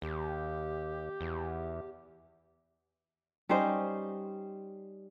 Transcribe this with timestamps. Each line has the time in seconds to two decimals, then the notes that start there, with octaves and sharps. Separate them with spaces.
0.02 D#2 G4
1.21 E2
3.49 G3 C#4 D#4 C5